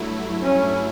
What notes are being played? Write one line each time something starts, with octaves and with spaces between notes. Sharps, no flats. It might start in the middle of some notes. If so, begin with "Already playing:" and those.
Already playing: G2 F#3 A3 E4
C#4